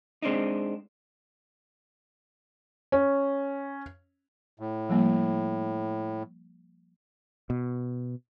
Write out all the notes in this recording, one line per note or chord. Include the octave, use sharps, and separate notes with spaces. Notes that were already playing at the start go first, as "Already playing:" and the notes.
G#3 C4 D4 D#4
C#4
A2
F3 G3 A#3
B2